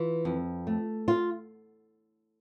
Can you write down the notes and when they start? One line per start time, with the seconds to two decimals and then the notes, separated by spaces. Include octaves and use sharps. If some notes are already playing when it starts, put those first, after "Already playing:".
Already playing: E3 F4
0.25 F2
0.67 A3
1.08 F4